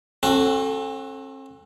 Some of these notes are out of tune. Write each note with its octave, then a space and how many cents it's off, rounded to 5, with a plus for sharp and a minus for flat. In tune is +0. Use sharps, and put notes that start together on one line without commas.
C4 +45 F#4 +0 A4 +0